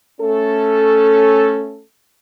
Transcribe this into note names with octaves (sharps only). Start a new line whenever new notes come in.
A3 C#4 A4